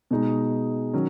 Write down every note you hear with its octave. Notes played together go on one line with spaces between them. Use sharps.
B2 G#3 D#4
D#3 F#3 C#4